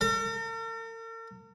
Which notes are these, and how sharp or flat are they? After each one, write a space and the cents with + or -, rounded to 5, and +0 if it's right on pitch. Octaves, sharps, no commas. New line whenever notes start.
A#4 -45